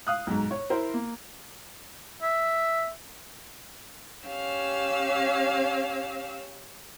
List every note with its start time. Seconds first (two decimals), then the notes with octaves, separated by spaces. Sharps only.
0.07 F5 D#6 F#6
0.27 B1 G#2
0.51 C#5
0.70 E4 A#4 C5
0.94 A#3
2.22 E5
4.27 C#4 G4 F5 E6